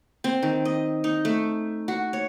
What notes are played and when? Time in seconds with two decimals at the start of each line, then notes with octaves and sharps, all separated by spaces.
0.24 C4
0.43 D#3
0.65 D#5
1.04 D#4
1.25 A3
1.88 F#4
2.13 C#5